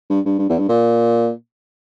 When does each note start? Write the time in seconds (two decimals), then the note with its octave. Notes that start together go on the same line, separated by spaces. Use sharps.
0.10 G2
0.25 G2
0.39 G2
0.49 E2
0.59 G2
0.69 A#2